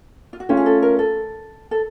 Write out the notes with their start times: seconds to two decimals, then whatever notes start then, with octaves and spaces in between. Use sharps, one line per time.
0.33 F4
0.40 F#4
0.49 A3 C#4 F4 G4
0.57 G#4
0.66 A4
0.82 A#4
0.99 A4
1.71 A4